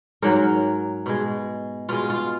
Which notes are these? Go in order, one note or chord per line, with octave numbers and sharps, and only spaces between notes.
G#2 F#3 A#4
B2 G#3
B2 G#3 F4
F4